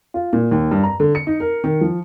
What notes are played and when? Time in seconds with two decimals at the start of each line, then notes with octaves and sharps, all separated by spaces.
0.14 F4
0.33 A#2
0.51 D#2
0.71 G2
0.83 A#5
1.00 D3
1.15 C#7
1.27 D#4
1.40 A#4
1.64 D#3
1.81 F3